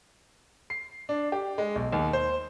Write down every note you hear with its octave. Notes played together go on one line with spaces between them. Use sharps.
C7
D4
G4
G#3
B1
D#2
C5